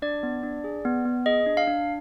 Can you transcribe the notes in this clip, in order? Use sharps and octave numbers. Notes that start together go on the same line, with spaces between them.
D4 D5
B3
D4
G#4
B3
B3
G#4 D#5
D4
F5
D4